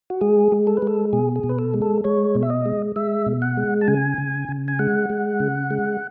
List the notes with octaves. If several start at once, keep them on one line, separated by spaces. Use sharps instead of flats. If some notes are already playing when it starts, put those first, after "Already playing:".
F#4
G#3 G#4
G#3
A4
B4
G#3 A4
B2 G#4
G#4
B2
B4
A4
G#3
A4
G#3 C#5
B2
E5
D#5
G#3
G#3 E5
B2
F#5
G#3
A5
C#3 G#5
C#3
C#3
G#5
G#3 F#5
G#3
C#3
G#3